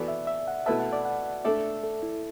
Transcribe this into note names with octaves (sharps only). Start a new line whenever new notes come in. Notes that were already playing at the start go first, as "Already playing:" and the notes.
Already playing: E3 B3 F#4 A4 D5
E5
E5
F#5
B2 A3 E4 B4 E5 A5
F#5
D5
F#5
A3 D4 A4 D5 E5
A4
E4